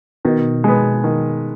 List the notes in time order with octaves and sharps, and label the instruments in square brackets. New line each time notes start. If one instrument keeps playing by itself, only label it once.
[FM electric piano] B2 [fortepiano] D#3
[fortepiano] G#3 B3
D#3